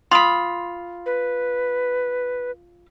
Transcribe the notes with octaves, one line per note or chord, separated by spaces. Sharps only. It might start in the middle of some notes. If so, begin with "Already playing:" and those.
F4 B5 C6 D#6
B4